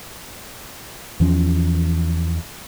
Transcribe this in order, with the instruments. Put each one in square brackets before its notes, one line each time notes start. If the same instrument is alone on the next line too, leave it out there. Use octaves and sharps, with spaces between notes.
[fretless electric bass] E2 E3 F3 C#4